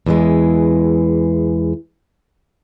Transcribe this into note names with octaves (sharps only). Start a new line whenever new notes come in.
E2 E3 G#3